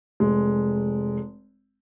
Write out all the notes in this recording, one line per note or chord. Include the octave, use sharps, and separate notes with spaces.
F1 G#3